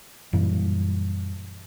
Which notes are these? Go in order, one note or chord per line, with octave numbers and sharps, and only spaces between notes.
F#2 A#2 E3 G3